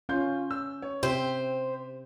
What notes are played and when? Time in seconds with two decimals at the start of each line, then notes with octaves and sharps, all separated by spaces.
0.09 C#4 F4 C6 G6
0.51 E6
0.82 C#5
1.03 C3 C4 G4 C5 E5